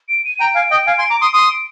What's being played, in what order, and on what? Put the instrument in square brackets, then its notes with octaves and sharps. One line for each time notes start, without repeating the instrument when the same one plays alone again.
[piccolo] D7
D#7
[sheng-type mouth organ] G5 A#5 [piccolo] D7
[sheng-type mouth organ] F5 G#5
D#5 G5
F5 G#5
G#5 C6
A#5 D6
C6 D#6
[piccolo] D7
[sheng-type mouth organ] C6 D#6 [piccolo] D#7
[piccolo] D7